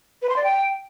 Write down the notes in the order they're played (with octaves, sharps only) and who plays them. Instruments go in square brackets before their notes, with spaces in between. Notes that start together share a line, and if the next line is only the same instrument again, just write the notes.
[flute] B4
C6
D5
G5